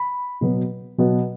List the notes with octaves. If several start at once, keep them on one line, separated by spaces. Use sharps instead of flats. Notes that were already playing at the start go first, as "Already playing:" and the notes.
Already playing: B5
B2 F#3 B3
B2 F#3 B3